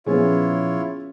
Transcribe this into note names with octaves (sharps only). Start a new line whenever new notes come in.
A#2 F3 B3 C#4 E4 F4 G#4 C#5